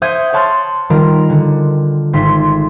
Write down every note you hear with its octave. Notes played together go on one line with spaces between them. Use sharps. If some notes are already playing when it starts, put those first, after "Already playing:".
C5 E5 F#5 D#6 G6 G#6
C#5 F#5 A5 C6 F6 A6
D#3 G3 F4 A#4
D3
G#1 C6 B6